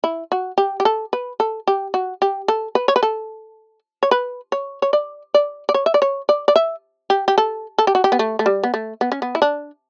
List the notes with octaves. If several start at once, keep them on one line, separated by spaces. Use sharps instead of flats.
E4
F#4
G4
G4
A4
B4
A4
G4
F#4
G4
A4
B4
C#5
B4
A4
C#5
B4
C#5
C#5
D5
D5
D5
C#5
E5
D5
C#5
D5
D5
E5
G4
G4
A4
A4
G4
F#4
G4
B3
A3
A3
G3
B3
A3
B3
C#4
B3
E4
D4